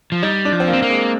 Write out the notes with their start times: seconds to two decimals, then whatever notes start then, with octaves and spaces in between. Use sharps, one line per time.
0.12 F3
0.23 G3 D#4
0.45 D4
0.52 F3
0.60 C4
0.68 A#3
0.73 C4
0.82 A#3
0.90 G#3